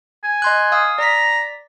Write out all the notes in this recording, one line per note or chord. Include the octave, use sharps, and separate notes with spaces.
G#5
D#5 C6 F#6
F5 D#6 E6
D5 A#5 B6